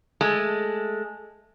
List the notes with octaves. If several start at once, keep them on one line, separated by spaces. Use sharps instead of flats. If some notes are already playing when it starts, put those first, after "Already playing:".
G#3 A3